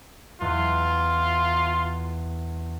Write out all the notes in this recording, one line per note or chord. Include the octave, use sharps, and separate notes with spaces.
E2 F4